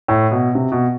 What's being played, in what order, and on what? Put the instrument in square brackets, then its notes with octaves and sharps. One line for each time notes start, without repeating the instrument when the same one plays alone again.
[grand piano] A2
B2
C3
B2